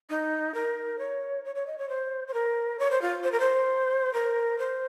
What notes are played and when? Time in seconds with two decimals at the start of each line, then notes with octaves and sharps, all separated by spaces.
0.10 D#4
0.54 A#4
0.99 C#5
1.45 C#5
1.55 C#5
1.67 D#5
1.78 C#5
1.89 C5
2.28 C5
2.34 A#4
2.79 C#5
2.91 C5
3.02 F4
3.24 C5
3.32 A#4
3.40 C5
4.14 A#4
4.58 C5